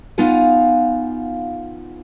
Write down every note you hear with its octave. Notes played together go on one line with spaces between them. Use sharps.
B3 D#4 F4 F5 F#5 G#5